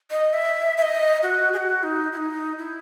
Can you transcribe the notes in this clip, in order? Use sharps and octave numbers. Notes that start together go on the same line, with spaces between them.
D#5
E5
E5
D#5
F#4
G#4
F#4
D#4
E4
D#4
E4